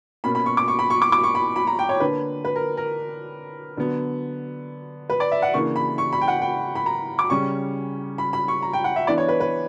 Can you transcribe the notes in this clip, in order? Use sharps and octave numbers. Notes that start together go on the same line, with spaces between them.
B2 A#3 C#4 B5
B5
C#6
D6
C#6
B5
C#6
D6
D6
C#6
B5
B5
A#5
G5
C#5
D3 A#3 D4 B4
B4
A#4
A#4
D3 F#3 B3
B4
D5
E5
F#5
C#3 E3 A#3 D4 C#6
B5
C#6
B5
G5
F#5
G5
B5
A#5
D6
C#3 G3 C#4 C#6
B5
B5
C#6
A#5
G5
F#5
E5
E3 B3 D4 D5
C#5
B4
B4